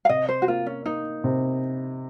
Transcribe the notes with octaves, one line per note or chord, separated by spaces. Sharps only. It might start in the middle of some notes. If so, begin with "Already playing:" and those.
F5
C3 D#5
C5
F#4
A#3 F4
C#4
A#3 D#4
C3